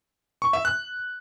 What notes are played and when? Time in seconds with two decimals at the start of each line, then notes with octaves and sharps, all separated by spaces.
0.42 C#6
0.53 E5
0.65 F#6